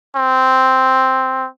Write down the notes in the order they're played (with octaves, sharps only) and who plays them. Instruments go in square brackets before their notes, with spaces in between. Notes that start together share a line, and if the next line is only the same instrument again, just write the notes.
[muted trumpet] C4